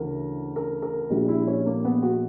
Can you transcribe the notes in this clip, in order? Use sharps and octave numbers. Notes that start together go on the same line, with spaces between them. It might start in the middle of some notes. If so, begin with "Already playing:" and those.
Already playing: D2 C#3 E3 A#4
A#4
A#4
A#1 A#2 G3 F#4
E4
C#4
A#3
B3
F#4